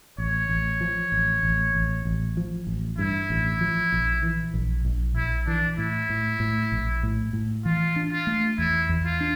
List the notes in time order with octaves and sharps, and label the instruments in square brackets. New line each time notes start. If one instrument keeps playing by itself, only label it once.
[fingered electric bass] A1 [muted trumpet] C#5
[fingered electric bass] A1
F3
A1
A1
A1
A1
F3
A1
[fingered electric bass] G2 [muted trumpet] E4
[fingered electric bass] A1
F3
A#1
E3
A#1
A#1
[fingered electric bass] A#1 [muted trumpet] E4
[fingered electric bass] E3 [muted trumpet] D4
[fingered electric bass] A2 [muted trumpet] E4
[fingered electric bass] A2
A2
A#1
A2
A2
[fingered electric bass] E3 [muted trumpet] F4
[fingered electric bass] D4
[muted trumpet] F4
[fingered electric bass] A3
[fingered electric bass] E2 [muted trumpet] E4
[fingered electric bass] E2
[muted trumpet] F4
[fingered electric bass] D4